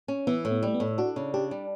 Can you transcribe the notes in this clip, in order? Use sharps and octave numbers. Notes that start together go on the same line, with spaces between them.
C#4
E3 B3
A2
B3
G3 A3
B3
A2
D4 F#4
C#3
D4 G4
G3